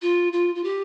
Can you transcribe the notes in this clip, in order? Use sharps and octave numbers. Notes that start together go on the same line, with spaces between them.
F4
F4
F4
G4